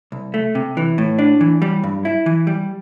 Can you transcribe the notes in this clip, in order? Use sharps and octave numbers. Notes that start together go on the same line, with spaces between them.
C2
A3
C3
E3
A2
D4
E3
G3
G2
E4
E3
G3